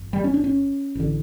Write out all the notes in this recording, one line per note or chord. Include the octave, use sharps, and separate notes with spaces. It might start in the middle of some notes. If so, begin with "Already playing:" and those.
Already playing: G1 F2
G3
C#4
D4
C#4
A1 D3